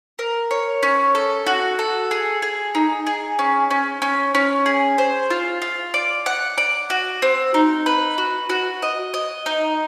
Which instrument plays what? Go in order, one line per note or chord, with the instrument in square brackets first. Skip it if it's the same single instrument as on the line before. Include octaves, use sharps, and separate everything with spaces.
[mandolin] A#4
C#5
C#4
A4
F#4
A4
G#4
G#4
D#4
G#4
C#4
C#4
C#4
C#4
G#4
C5
F4
F4
D5
F#5
D5
F#4
C4
D#4
B4
F#4
F#4
D#5
D#5
D#4